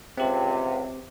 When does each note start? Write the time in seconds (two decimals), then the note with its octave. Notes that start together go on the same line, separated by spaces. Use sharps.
0.17 C#2 C3 C4 G4